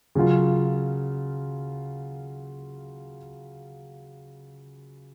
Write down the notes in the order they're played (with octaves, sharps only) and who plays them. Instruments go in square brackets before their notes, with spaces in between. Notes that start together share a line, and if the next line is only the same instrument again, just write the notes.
[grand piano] C#3 F#3 C#4 F4